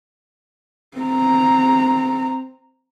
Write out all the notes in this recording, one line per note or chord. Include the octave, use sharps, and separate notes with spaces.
C4 A#5